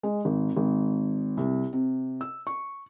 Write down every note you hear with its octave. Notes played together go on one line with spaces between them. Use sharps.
G#3
G#1
G#1
C2
C3
E6
C#6